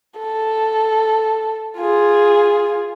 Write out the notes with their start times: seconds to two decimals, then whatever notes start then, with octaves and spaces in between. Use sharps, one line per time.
0.18 A4
1.77 F4 G#4